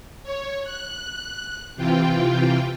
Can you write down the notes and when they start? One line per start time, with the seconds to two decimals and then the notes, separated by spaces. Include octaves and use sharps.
0.23 C#5
0.63 F#6
1.76 C3 E3 F4 G5